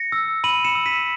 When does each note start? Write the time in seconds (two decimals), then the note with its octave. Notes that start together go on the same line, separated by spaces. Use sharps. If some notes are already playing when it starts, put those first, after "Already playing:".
Already playing: A#6 C#7
0.12 E6
0.44 B5 D#7 F#7
0.64 C#7 E7
0.75 E6
0.86 B6 D#7